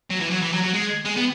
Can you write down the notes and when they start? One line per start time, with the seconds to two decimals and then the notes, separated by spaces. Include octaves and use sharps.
0.10 F#3
0.21 E3
0.31 F#3
0.42 E3
0.53 F#3
0.63 F#3
0.74 G#3
1.05 G#3
1.17 B3